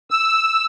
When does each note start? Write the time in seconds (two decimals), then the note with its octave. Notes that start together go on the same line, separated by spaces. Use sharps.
0.11 E6